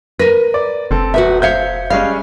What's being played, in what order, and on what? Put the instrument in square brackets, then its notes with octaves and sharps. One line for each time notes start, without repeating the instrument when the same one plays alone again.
[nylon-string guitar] A#4 B4 [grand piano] A#6 D#7
[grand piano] D5
[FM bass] F1 [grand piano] C4 A4
[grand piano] D#1 [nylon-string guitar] F#4 B4 E5
[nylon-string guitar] C5 E5 F5 [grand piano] G6 G#6 C#7
[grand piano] G3 G#3 C#4 [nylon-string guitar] F5